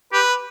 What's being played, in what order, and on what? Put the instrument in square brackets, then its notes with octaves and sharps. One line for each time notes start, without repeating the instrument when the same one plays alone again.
[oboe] G4 [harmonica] B4